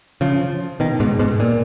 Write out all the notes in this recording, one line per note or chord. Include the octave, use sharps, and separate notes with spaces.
C#3 F3
B2 D#3
G#2 B2
G#2 B2
A#2